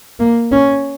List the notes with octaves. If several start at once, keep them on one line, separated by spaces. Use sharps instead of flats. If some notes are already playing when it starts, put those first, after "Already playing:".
A#3
C#4